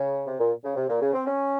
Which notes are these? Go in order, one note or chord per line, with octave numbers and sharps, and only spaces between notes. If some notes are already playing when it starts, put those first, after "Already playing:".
Already playing: C#3
C3
A#2
C#3
C3
A#2
C#3
C4
C#4